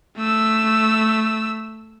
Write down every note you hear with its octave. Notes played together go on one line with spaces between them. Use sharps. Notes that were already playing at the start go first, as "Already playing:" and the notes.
A3 E6